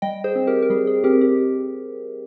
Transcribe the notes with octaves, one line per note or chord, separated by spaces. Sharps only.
G3 D#5 G5
G#4 C5
C4
G4 A#4
A#4
G3 G#4
G#4
C4 G4 A#4
G4